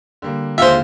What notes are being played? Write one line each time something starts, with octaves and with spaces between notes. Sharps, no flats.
D3 G3 A#3
D#2 D3 G#3 F4 C5 E5